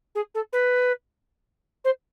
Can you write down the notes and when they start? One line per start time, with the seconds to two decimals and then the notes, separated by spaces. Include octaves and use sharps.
0.15 G#4
0.34 A4
0.53 B4
1.84 C5